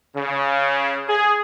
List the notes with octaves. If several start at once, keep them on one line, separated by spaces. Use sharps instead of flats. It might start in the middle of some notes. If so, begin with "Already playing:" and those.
C#3
G#4